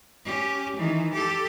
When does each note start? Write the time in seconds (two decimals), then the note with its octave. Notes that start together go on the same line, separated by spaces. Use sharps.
0.25 C#4 G4
0.76 D#3 E3
1.13 G4 A4